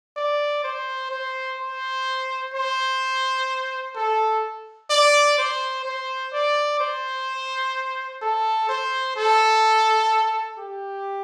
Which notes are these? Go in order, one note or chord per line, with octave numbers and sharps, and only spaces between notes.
D5
C5
C5
C5
C5
A4
D5
C5
C5
D5
C5
A4
C5
A4
G4